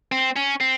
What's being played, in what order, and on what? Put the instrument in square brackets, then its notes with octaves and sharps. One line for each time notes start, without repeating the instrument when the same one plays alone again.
[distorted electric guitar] C4
C#4
C4